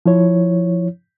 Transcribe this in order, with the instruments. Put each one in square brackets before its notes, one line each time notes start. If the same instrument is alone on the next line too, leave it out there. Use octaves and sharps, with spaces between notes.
[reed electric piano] F3 E4 C#5